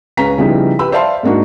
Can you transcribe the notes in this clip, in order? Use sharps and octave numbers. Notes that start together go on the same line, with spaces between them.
C#2 C#4 B4 F5 A#5 B6
C#3 F3 G3 B3 D#4 E4
G4 B4 B5 E6
C5 D5 E5 F5 A5 C6
G#2 A#3 D4 D#4 F#4